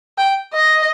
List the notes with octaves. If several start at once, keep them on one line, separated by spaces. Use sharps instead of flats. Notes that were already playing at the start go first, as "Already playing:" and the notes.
G5
D#5